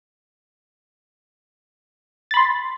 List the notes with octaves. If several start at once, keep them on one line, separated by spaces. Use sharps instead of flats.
B5 C6 A6